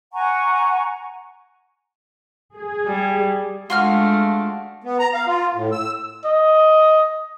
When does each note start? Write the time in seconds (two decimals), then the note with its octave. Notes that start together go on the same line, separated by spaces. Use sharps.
0.13 F#5 G#5 A#5 C#6
2.57 G#4
2.87 G3
3.70 G#3 A3 D4 F4 F#4 F6
4.84 B3
4.99 A#5
5.13 F5
5.27 F4
5.54 A2
5.72 E6
6.24 D#5